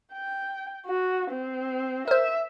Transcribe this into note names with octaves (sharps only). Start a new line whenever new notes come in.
G5
F#4
C4
A#4 C5 E5